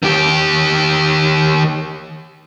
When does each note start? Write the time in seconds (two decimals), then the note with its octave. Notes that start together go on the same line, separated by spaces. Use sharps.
0.03 D#3 G4